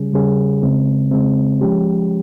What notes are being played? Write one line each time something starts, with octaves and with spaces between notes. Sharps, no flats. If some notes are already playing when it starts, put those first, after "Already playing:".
Already playing: C#3 G3 C#4 G#4
C#3 G3 C#4 G#4
C#3 G#3 C4
C#3 G#3 C4
F3 G#3 C#4 G4